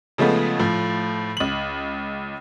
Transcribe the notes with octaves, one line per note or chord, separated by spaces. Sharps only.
C#3 F3 G#3 A3 B3
A2 F3
C#2 F#7